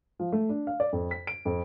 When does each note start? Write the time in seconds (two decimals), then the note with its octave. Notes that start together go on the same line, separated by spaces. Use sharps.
0.19 F3
0.32 A3
0.49 D4
0.67 F5
0.80 D5
0.93 F2
1.11 B6
1.27 D7
1.45 F2